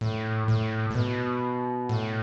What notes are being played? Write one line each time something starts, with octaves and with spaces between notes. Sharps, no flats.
A2
A2
A2
B2
A2